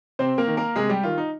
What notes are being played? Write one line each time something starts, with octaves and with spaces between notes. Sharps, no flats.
C3 C4 C5
A#3 A#4
D#3
A#3 A#4
C3 G#3 G#4
G3 G4
D#3 F4
D#4